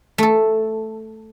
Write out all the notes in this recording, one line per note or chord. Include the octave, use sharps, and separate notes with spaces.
A3 A4